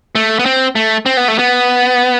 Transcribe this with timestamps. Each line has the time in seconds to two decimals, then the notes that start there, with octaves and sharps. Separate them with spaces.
0.15 A3
0.39 B3
0.46 C4
0.75 A3
1.06 C4
1.17 B3
1.28 A3
1.39 B3